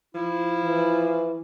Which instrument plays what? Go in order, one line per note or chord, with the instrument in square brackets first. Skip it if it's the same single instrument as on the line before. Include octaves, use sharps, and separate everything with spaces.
[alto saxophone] F3 [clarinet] E4
[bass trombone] E3